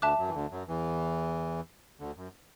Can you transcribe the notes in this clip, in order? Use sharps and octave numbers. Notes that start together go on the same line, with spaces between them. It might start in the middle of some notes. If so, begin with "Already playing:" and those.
D2 D3 E5 A5 D6 F#6
F#2 F#3
E3
D2 D3
F#2 F#3
E2 E3
D2 D3
F#2